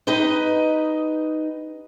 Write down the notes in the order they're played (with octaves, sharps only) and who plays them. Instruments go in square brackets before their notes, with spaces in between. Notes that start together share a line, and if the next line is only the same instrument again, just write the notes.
[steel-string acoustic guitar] D#4 G4 B4 D#5